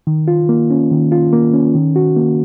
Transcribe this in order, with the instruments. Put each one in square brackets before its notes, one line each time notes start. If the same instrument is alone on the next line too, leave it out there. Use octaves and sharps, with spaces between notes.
[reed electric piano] D#3
F4
A#3
C#4
D#3
F4
A#3
C#4
D#3
F#4
A#3